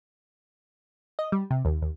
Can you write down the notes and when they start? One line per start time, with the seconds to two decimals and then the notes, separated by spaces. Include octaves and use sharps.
1.19 D#5
1.32 G3
1.51 C3
1.65 D#2
1.82 D#2